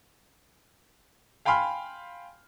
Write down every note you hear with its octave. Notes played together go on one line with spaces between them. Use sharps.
F5 G5 G#5 B5 C6 F6